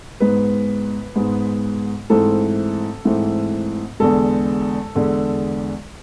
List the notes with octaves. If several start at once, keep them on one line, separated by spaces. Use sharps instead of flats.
G#2 G#3 B3 B4
G#2 G#3 B3
G#2 E3 A3 C4 A4
G#2 E3 A3 C4
E2 D3 G#3 A4
E2 D3 G#3